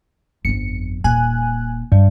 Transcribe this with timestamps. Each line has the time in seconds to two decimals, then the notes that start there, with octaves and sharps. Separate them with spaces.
0.45 G1 F2 C#7
1.04 D#1 A#2 G#5 F#6
1.92 G2 G3